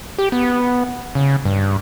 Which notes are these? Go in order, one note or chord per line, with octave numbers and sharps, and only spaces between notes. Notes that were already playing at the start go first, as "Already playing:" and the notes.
G4
B3
C#3
G2